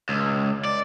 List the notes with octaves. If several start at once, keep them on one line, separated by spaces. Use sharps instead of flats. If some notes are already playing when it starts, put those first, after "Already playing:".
C#2
D5